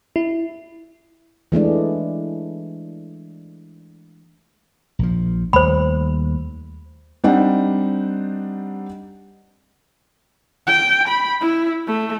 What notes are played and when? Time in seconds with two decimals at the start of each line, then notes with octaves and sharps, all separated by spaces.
0.16 E4
1.52 E3 G#3 A3 D4
4.99 A#1 F3
5.53 D#2 G3 A3 C5 B5
7.24 G3 C4 D4 D#4 G4 F#5
10.67 G5
11.08 B5
11.41 E4
11.87 A3